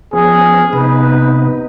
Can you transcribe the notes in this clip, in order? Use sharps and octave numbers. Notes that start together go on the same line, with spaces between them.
F3 B3 C#4 G#4
C3 B3 D#4 B4